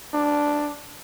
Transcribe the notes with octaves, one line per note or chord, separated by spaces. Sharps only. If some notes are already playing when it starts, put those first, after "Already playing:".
D4